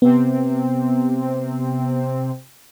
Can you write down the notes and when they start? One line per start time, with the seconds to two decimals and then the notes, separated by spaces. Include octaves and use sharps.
0.02 C3 B3 C4